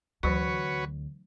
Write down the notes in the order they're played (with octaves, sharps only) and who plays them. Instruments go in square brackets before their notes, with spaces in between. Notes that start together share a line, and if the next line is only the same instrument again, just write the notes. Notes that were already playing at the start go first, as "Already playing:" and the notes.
[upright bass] D2 [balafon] E3 F#3 C#6 [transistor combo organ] F#4 B4 C#5